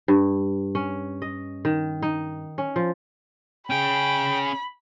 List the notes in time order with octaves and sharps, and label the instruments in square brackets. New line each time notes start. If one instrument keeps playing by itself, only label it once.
[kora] G2
C#4
D#5
D#3
D#4
C#4
F3
[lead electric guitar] C#4 G#4 [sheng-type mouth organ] G5 [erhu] B5